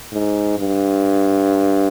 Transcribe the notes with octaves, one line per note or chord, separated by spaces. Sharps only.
G#2
G2